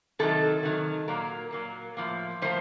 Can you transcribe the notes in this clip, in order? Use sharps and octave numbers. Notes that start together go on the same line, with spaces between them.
C3 D#3 F#3 A4
C3 D#3 F#3
A#2 F#3 A#3 A#4
A#2 F#3 A#3
A2 F3 A#3
A2 F3 A#3 C5